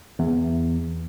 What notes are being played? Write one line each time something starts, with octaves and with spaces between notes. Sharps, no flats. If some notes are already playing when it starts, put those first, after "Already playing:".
E2